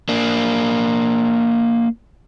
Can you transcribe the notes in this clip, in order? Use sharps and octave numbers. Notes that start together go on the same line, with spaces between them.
A#3 D4